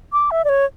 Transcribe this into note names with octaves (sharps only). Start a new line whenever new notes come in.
D6
E5
D5
C#5